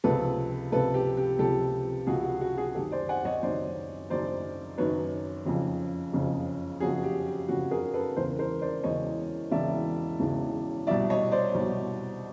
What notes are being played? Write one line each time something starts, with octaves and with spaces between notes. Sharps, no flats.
C#2 C3 F3 A4 B4
C#2 C3 F3 A4 B4
G4
G4
C#2 C3 F3 G4 A4
C#2 C3 F3 F#4 G#4
F#4
F#4
F#4 G#4
F#1 F#2 D#3 G4 A4
C5 D5
F#5 G#5
C#5 D#5
F#1 F#2 D#3 C5 D5
F#1 F#2 D#3 C5 D5
F#1 F#2 D#3 B4 C#5
F#1 F2 C#3 F3
F#1 F2 C#3 F3
F#1 F2 C#3 F3 F#4 G#4
G4
G4
F#1 F2 C#3 F3 F#4
G#4 A#4
A4 B4
E1 E2 C#3 E3 A#4 C5
A#4 C5
C5 D5
E1 E2 C#3 E3 C#5 D#5
E1 E2 C#3 E3 D5 E5
E1 E2 C#3 E3
C2 B2 D5 E5
C#5 D#5
C5 D5
C2 B2